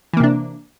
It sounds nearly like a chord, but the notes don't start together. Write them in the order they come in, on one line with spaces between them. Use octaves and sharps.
E3 A#3 C3 D4